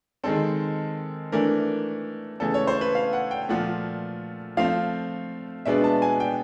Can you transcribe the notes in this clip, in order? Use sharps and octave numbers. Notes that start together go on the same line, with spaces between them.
D#3 G#3 C4 A4
E3 A3 D4 A#4
C#3 E3 A3 A4
C#5
C5
B4
F5
F#5
G5
A#2 F3 A3 F#5
F3 A3 C4 F5
B2 G#3 B3 D4 E5
A5
G#5
G5